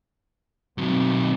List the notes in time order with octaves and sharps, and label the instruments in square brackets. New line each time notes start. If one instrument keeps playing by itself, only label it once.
[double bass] B2 [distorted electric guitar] D#3 F#3 [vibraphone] C4